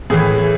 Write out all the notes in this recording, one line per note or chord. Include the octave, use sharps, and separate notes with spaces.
A2 E3 G#4